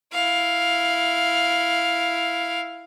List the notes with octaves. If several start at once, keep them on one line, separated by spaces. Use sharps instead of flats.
E4 F5